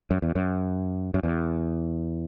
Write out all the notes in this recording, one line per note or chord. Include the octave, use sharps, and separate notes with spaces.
F#2
E2
F#2
F#2
E2